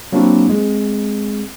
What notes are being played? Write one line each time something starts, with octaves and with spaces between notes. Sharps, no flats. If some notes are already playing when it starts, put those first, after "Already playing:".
F#3 A#3 C4 D4 E4 F#4
G#3 C4